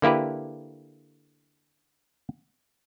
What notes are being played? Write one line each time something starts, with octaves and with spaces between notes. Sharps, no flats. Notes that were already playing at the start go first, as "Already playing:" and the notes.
D3 A#3 E4 G4 B4